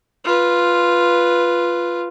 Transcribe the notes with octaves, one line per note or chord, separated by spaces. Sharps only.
F4 B4